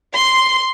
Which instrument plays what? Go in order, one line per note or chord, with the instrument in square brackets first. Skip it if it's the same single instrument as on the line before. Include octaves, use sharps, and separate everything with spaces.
[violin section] C6